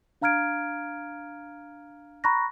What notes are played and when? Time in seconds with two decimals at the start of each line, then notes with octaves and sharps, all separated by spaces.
0.22 D4 F5 A#5 F6 G#6 D7
2.24 A#5 B5 C#6 F#6 A#6